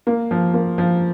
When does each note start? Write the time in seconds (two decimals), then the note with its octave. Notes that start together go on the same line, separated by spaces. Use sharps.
0.07 A#3
0.31 F3
0.54 A#3
0.78 F3